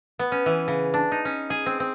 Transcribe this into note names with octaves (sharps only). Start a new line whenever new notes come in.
B3
C#4
E3
C#3
D4
D#4
C#4
G#4
C4
C4